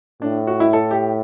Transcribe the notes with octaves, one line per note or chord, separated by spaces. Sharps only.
A2 D4
F#4
E4
A4
G4